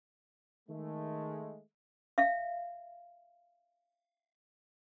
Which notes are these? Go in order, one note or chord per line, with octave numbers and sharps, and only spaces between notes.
D#3 G#3 A3
E5 F5